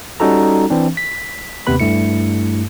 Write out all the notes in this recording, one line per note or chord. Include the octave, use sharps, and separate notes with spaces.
G3 C#4 D#4 F#4 A4 A#5
E3 C4 D4
B6
D#2 C3 B3 B4 B5
G2 A3 E4 C#7